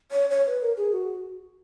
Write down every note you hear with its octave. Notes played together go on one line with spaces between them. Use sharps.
C#5
C#5
B4
A#4
G#4
F#4